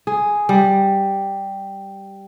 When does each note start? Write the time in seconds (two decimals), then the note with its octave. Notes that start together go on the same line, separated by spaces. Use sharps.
0.07 G#4
0.49 G3